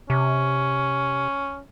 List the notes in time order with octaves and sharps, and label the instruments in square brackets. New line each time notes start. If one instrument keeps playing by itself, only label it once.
[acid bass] C3 [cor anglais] C#4